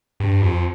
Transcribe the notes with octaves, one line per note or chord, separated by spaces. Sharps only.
G2
F2